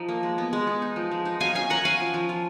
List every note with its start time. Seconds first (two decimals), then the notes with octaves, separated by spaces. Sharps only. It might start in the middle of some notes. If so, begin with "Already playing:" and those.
Already playing: F3 D#4 A#5
0.09 A#3
0.23 G#3
0.38 B3
0.53 G#3
0.67 B3
0.82 D#4
0.96 F3
1.11 G#3
1.25 D#4
1.40 F#3 F5 G#5
1.55 C#4 F5 G#5
1.70 C#4 F#5 A#5
1.85 C#4 F5 G#5
2.00 F3
2.14 F3
2.29 F4